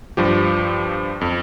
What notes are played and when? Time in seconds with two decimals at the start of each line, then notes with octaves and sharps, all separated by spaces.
0.17 G2 F3 G4
1.21 F2